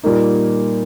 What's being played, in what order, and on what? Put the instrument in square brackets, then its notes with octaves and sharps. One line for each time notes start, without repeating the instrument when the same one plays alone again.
[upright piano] A#2 G3 A#3 D#4